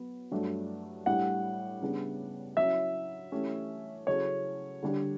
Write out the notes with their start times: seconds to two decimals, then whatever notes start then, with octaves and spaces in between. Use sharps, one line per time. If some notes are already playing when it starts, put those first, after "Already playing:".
Already playing: F#3 B3
0.31 G2 F#3 A3 D4
1.06 A2 G3 D4 G4 F#5
1.81 C#3 G3 B3 D4
2.57 F#3 C#4 E4 E5
3.32 E3 A3 C#4 G4
4.07 C#3 F#3 C#4 E4 A4 C#5
4.82 D3 G3 D4 G4